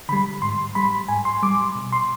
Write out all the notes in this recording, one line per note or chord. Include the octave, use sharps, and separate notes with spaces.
D3 G3 B5
G#2 C6
G3 B5
G#2 G#5
C6
G3 D6
B2
C6